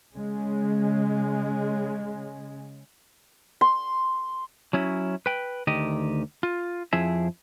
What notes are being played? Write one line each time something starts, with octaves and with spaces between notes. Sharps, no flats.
C#3 G#3
C6
F#3 C#4 E4
B4 G5
D2 D#3 G4 D#5
F4
F2 F3 E4 G#4 E5